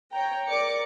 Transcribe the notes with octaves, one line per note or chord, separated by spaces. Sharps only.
C#5 G5 A#5
A#4 D5 D6 C#7